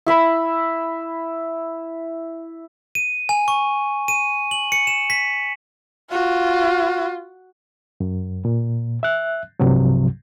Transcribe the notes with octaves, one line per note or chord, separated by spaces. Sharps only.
E4 E5 B5
D#7
G#5
C#6
D#7
F#7
C#7
E7
B6
F4 F#4
F#2
A#2
E5 F#6
C2 G2 C3 F3 F#3